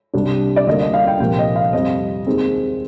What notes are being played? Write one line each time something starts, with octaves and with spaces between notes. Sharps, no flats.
C2 C3 G3 D4
D5
D2 D3 G3 A#3 D#5
D#5
F5
G5
C2 A#2 F3 A#3 G5
D#5
F5
F2 C3 G3 D#5
D#2 D#3 G#3 C4